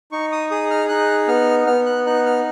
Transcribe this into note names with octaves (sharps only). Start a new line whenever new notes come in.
D#4 C#6
D#6
G#4 D#6
F6
D#4 F#6
B3 F6
B3 F6
F#6
D#4 F#6
F6